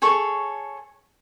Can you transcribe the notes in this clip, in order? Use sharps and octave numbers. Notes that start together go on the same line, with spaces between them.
G#4 A4 C#5 C#6